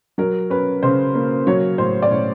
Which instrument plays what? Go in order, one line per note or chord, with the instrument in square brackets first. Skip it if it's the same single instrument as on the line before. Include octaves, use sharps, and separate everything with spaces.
[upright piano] F#3 A#4
C#4 B4
C#3 C5
A#3
F#3 C#5
A2 C5
D5
A2 C#5